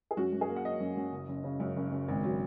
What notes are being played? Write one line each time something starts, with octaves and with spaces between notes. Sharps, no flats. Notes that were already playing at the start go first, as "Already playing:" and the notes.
G#4
F#2 F#4
F#2
G#4
A#3
F#5
F#3 D#5
F#2
F#2
F#1
F#1
C#3
F#2
F#1
F#1
G#1
F#3